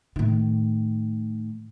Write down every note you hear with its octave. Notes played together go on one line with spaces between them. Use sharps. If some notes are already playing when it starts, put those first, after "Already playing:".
A2 D#3